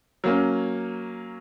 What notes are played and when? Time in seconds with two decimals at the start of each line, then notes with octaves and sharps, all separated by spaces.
0.24 F#3 A#3 C#4